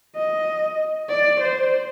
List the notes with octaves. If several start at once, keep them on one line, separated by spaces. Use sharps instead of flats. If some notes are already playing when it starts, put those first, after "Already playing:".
D#5
D5
C5